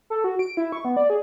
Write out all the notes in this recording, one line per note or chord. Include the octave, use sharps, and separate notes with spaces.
A4
F#4
D7
E4
C#6
B3
D5
G#4